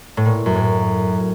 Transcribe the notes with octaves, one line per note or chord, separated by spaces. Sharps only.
A2
A#2
F#2
A2